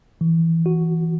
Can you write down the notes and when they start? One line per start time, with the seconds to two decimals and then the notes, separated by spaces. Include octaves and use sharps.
0.21 E3
0.66 F#4